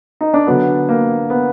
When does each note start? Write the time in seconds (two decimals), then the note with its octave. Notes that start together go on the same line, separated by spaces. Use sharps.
0.21 D#4
0.34 D4
0.47 D3 F#3 B3
0.89 A#3
1.30 B3